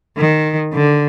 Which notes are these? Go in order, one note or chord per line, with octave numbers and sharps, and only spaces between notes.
D#3
D3